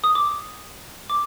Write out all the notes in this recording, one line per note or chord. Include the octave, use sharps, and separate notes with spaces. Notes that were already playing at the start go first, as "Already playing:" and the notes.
D#6
D6
D6